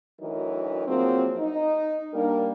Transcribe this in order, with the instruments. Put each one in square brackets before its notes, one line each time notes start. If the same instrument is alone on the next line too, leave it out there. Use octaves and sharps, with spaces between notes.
[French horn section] D2 E3 F#3 D#4 A#4
F3 F#3 A#3 C4 G#4
D#4
G3 A#3 D4 A#4